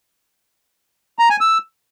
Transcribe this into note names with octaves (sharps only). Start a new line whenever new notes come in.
A#5
G#5
E6